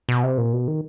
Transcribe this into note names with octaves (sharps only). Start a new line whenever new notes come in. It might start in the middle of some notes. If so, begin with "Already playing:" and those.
B2
C3
A#2
B2
D#3